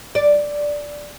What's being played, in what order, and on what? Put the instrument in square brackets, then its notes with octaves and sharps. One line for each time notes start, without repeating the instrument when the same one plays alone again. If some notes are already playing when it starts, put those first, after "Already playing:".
[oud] D5